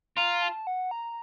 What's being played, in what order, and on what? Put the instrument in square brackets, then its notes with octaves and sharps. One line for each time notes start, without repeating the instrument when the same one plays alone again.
[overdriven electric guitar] F4 [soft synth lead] A#5
[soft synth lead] A5
F#5
A#5